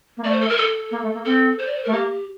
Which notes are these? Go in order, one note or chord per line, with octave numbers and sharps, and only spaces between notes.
A#3
A3 D5
C5
A4
A#4
A4
A#3
A3
A#3
C4 A4
C5
D5
C5
A3 A#4
A#3 G4